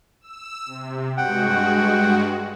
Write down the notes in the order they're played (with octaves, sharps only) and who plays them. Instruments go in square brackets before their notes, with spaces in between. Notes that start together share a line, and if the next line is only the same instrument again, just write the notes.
[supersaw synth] E6
C3
[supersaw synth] G2 G#3 F#4 [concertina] F#5 G5